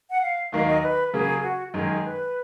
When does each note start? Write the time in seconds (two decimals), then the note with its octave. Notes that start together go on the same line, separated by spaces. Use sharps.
0.10 F#5
0.22 F5
0.52 D#2 D#3 F#3 A#3 D#4 F5
0.67 D#5
0.83 B4
1.13 C#3 F#3 A#3 G#4
1.43 F#4
1.74 F#2 D#3 G#3 G#4
2.05 B4